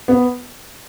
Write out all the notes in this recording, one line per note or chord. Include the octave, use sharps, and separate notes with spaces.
B3